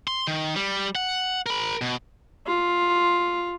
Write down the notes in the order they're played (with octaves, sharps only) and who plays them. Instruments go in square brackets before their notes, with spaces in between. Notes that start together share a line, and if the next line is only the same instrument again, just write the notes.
[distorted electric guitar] C6
D#3
G3
F#5
A#4 B5
B2
[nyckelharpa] F4